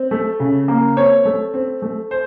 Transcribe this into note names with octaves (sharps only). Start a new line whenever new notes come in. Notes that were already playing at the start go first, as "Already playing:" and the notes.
Already playing: C4
A3
C#3
A#3
C4 C#5
A3
C4
A3
C5